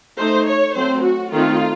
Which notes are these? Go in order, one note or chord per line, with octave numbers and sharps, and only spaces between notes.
A3 D#4 C5
C#5
F#3 A3 C4 C5
F#4
D#3 A3 C4 D#4 F4